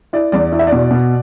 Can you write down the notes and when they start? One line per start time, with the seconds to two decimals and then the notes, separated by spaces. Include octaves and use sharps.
0.13 E4 D5
0.32 E2 D5
0.52 E4 D5
0.59 E5
0.67 D5
0.72 B2
0.91 B2